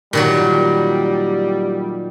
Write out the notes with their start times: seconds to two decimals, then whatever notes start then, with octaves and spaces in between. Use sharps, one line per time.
0.13 A#2 D#3 F#3 G3